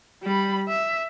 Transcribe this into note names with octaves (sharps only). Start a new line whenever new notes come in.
G3 B5
E5